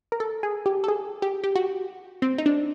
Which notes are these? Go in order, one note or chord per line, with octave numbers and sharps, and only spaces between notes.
A#4
A4
G#4
G4
A4
G#4
G4
G4
F#4
C4
D#4
D4